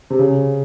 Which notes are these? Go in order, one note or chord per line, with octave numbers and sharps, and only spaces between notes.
C3
C#3